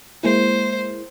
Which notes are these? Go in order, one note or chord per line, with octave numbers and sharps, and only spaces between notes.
G#3 A#3 E4 C5